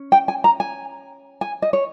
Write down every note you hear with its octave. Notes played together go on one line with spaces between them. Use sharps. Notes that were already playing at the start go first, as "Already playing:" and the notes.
Already playing: C#4
G5
G#5
A#5
G#5
G#5
D#5
C#5